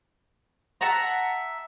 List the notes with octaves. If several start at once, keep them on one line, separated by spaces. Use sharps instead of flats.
E5 F#5 A5 A#5